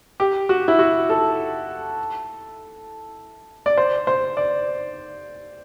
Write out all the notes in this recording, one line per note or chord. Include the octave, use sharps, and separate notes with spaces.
G4
F#4
E4
F#4
A4
D5
C5
C5
D5